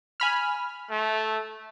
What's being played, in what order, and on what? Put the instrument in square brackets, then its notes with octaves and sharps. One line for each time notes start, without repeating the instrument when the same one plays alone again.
[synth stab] G#5 B5 F6
[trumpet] A3